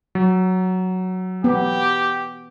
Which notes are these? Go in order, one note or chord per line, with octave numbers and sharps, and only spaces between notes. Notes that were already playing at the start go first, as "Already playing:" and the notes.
F#3
B3 G4